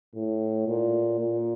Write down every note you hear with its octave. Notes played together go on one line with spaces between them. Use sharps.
A2
A#2
A#2